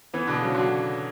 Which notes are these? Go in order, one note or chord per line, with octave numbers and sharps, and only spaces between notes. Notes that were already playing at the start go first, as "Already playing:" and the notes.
E3 B3
B2 D3
C#3 F#3
D3 F#4